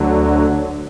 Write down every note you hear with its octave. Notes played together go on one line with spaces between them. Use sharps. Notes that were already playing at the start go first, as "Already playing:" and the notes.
Already playing: D2 D3 F#3